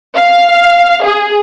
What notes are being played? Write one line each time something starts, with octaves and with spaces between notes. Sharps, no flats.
F5
G#4